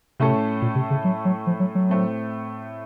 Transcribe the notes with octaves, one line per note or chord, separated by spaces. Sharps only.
A2 C3 A3 C#4 A4
A#2
C3
C#3
F#3
F#3
F3
F#3
F#3
A2 A3 C4